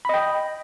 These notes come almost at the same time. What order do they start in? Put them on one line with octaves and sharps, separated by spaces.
B5 D#5 G5